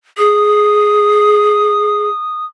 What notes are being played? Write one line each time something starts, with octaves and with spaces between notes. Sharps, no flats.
G#4 D#6